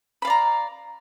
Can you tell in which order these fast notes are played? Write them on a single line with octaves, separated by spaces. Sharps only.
B5 F5 D5 A#5